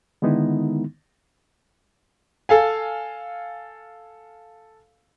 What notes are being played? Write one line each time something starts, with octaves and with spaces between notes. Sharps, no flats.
D3 D#3 G#3 B3 D#4 E4
A4 F5 G#5